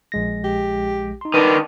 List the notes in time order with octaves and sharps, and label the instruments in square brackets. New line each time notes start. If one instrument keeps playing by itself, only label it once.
[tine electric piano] A#1 G#3 A#6
[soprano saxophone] G4
[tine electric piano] D#4 C6
[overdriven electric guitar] D#3 D4 [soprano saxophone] B4